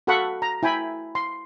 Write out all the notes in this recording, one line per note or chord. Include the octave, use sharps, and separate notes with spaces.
F#4 A4 F5 F#5 B5 C#6
A#5
E4 G5 G#5 B5
C6